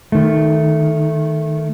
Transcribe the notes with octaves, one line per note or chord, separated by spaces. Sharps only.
D#3 A3